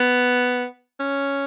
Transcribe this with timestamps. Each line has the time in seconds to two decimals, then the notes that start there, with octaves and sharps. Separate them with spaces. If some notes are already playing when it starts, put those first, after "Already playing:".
Already playing: B3
1.00 C#4